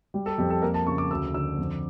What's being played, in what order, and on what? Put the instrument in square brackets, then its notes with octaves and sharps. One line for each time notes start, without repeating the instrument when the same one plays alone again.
[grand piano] G3
A4
F2 G4
A4
A#3 A#4
A5
C#3 C#6
D6
D2 E6
D3 E6
F2